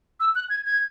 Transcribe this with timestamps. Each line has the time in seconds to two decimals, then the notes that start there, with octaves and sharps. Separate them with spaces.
0.20 E6
0.35 F#6
0.50 G#6
0.65 G#6